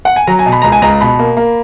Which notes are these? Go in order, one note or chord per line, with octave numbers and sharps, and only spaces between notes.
F#5
G#5
F#3 A#5
G#5
B2
B5
C#2 A#5
G#5
C#2 A#5
B2 B5
A#3
A#3